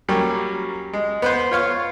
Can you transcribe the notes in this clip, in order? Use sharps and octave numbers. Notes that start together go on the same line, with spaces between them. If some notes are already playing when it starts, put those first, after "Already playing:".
F#3 G3 A#3 C#4
G#3
B3 B4 C5
F4 C#5 F5 C#6